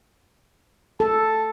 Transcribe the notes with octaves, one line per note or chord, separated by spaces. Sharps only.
A4 A5